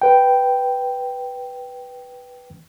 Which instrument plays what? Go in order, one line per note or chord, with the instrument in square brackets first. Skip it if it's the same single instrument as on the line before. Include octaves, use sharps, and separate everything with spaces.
[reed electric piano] B4 G5